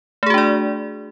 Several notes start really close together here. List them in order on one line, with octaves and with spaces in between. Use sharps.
A3 G#4 F#4 D4 D5